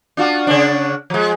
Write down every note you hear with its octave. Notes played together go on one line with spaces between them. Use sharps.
D4 F4 F#4
C#3 C#4 D4
F3 G#3